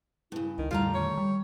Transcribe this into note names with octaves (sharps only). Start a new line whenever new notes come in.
G2 C#3 E4
C#2 D#3
F2 A#2 D3 G3 A3 F4 A#5
D#3 C#5
G3